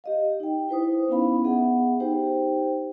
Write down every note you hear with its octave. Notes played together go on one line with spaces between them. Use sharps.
G4 D#5 F5
D#4 G5
E4 B4 C5 D#6
B3 C#4 D#4 E4 F5 B5
B3 G#4 E5 F#5
D#4 G4 C5 G5